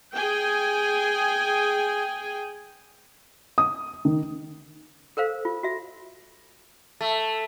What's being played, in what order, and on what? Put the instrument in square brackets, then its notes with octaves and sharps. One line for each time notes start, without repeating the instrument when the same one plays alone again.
[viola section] G#4 G5 G#5
[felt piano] D#6
D#3
[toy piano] A4 A#4 C5 F5
F4
F#4 E5
[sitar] A3